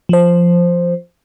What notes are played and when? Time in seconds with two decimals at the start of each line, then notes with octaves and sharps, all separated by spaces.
0.09 F3 C5